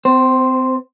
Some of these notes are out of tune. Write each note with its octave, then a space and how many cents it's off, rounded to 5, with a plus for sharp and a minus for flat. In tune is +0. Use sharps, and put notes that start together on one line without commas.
C4 -30 C5 +0